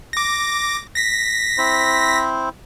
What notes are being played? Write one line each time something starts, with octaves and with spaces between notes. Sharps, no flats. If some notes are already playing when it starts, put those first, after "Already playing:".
D6 A#6
A#6 B6
C4 E4 C5